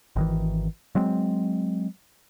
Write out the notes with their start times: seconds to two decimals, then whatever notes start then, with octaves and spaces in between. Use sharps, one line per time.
0.16 G#1 D#3 E3
0.95 F#3 G#3 C4